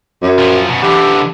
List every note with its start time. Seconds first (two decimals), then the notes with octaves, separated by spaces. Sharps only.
0.22 F#2
0.38 A#2 F3
0.68 F#2 B2
0.83 D3 E3 G4